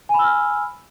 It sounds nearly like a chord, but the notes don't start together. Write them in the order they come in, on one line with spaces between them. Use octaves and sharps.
G#5 B5 E6 F6